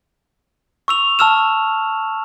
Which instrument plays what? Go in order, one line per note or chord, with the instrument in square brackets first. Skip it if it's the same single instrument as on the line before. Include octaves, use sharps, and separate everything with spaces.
[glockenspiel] C#6 E6 F7
A5 C#6 E6 F6 E7